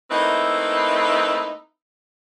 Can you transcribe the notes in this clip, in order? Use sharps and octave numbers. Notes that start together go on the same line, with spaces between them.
A3 A#3 C4 D#4 E4 B4